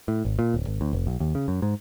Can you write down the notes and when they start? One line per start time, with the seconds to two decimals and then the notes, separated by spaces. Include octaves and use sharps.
0.08 A2
0.25 G#1
0.39 A#2
0.54 D1
0.67 G#1
0.81 D2
0.93 F1
1.07 B1
1.20 D#2
1.35 C#3
1.48 F#2
1.62 G#2